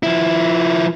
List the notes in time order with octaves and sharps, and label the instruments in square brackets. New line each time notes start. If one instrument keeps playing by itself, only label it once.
[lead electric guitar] F3 E4